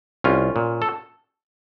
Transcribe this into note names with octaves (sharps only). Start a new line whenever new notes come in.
C2 C#4 F4
A#2
A4